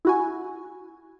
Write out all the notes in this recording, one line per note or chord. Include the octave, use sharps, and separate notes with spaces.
E4 F#4 G#5